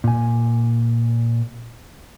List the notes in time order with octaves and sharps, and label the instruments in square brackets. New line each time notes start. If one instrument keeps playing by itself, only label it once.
[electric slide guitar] A#2 G#5